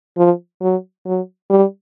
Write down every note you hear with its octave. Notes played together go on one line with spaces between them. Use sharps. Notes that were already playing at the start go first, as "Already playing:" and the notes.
F3
F#3
F#3
G3